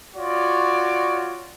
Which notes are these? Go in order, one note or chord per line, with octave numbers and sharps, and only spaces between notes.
F4 F#4 C#5 D5